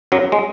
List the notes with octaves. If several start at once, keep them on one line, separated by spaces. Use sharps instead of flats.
F#2 F#3
G#3